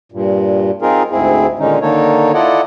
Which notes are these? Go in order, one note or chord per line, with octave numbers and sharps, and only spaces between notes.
G2 A#2
C4 D#4 F4 G#4 A#4
D2 G#2 C4 E4 G#4
A#2 D3 D#3 G#3 C#4 D#4
D3 D#3 A#3 D#4 A4 C#5
E4 F4 A4 D5 D#5 F#5